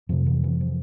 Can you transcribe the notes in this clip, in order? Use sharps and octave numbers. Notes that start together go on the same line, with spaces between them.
F2 C3 F3
E3
E3
F3